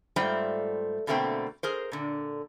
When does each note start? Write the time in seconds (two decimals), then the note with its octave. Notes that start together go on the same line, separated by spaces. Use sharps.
0.16 G#2 G3 A3 F4 C5 G5
1.07 B2 D3 A3 A#3 C4 G5
1.63 G#4 A#4 C5
1.92 A#2 D3